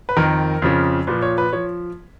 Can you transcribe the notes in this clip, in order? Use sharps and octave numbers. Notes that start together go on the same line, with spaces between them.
B4
F2 D#3 A#4
F2 C#3 F3
A#2 F3 B4
C#5
B4
F3 C#5